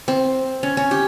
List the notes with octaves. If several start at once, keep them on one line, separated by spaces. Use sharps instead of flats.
C4
C#4
C#4
G4